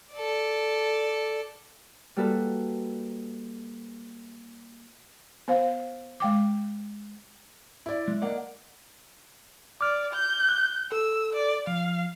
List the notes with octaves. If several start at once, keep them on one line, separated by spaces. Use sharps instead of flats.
A4 D5
G3 A#3 F#4 A4 B4
B3 C5 F5
G#3 G5 D6
E4 D5
G#3
A#3 D5 D#5 F#5
D5 D6 F6
G6
F#6
A4 E6
D5
F3 F5